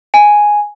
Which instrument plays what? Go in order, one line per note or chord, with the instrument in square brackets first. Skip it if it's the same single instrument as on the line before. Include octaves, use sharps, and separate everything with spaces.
[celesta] G#5